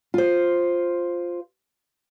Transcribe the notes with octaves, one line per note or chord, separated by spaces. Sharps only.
F4 C5